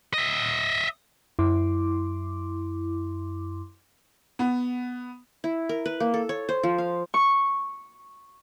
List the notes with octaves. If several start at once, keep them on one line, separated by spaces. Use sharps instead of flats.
D#5 E5
F#2 E4 C6 D6
B3
E4
A#4
B4
A#3
A4
C#5
C5
F3
F5
C#6